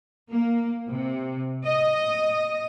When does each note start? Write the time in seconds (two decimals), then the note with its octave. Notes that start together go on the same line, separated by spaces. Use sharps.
0.29 A#3
0.88 C3
1.64 D#5